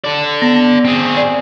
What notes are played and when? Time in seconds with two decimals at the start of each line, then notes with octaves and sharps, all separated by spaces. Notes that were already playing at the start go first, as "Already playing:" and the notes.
0.04 A4 D5
0.42 B3
0.85 C4 G#4
1.17 D5